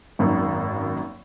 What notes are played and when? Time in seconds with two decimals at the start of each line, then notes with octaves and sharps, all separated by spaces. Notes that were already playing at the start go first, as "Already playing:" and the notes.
0.19 G#1 F#2 A#3 D#4